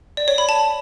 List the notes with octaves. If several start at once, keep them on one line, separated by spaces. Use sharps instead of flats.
D5
C#5
B5
A5